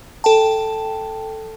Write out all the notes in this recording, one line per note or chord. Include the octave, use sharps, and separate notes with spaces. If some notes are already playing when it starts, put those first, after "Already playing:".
A4 G5 A5